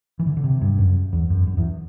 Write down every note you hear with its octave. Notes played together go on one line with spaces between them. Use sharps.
E3
D3
D3
C3
G2
F#2
E2
F#2
F#2
E2